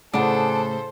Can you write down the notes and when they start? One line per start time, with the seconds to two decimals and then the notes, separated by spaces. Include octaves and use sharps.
0.14 A2 C#3 D4 G#4 A4 C5 F#5